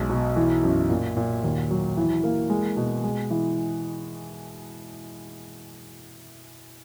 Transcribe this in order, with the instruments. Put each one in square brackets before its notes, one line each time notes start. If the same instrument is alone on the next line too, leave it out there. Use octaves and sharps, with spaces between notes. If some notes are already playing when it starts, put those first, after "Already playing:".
Already playing: [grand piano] B1 G#3
B2
E3
F#2
A#2
A#2
D#2
F#3
E3
A#3
G#3
B2
G#3
E3